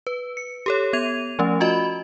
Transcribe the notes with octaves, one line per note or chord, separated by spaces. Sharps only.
B4
C#7
G4 A4 C#5
B3 G#6 D#7 F7
F3 A3 C#4
F4 F#4 D#5 B5